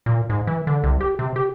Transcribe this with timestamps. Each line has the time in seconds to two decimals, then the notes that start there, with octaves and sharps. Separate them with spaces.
0.06 A#2
0.30 G#2
0.47 E3
0.67 D3
0.84 C2
1.01 G4
1.19 C3
1.36 G4